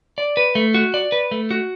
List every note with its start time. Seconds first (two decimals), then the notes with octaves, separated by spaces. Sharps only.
0.18 D5
0.37 B4
0.55 A3
0.74 F#4
0.94 D5
1.12 B4
1.31 A3
1.51 F#4